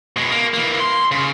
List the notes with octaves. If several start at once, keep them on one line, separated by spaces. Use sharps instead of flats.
B2 G#3
A#3
E3 A#3
C6
C#3